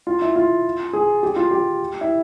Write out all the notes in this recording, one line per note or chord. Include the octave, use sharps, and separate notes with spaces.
F4
E4
F4
G#4
G4
F4
G4
E4